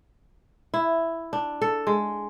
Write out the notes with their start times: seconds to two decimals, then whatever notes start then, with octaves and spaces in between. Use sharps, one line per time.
0.74 E4
1.33 D4
1.61 A4
1.87 G#3